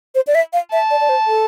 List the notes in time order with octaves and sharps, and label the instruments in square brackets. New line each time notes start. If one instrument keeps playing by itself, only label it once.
[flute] C5
D5
E5
F5
[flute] E5 [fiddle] A5
[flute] D5
D5
C5
A4